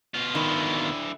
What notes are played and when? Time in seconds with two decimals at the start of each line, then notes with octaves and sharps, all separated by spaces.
0.14 B2 F4
0.35 D3 D#3 E4